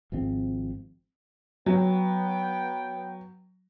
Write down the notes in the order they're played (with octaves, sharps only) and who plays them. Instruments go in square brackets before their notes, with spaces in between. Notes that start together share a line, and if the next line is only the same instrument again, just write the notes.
[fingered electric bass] G#1 G#2 F3 C4
[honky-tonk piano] F#3 [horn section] B3 G5